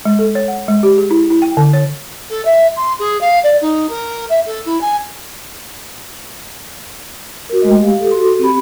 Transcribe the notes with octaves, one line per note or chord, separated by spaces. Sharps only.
G#3
A4
C#5
F#5
G#3
G4
G#4
E4
E4
G5
D3
C#5
A4
E5
C6
G#4
F5
D5
D#4
A#4
E5
A4
E4
G#5
F#4 A#4
G#3 A3 D#5
G4 F5
G4 A4
F#4 A4 C6
C4 G4 B5